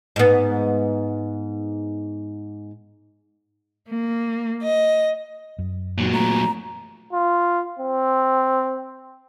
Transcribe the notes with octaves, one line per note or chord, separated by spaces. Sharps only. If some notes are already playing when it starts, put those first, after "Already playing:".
G#2 B3
A#3
D#5
F#2
A#2 F#3
A3 A#5
F4
C4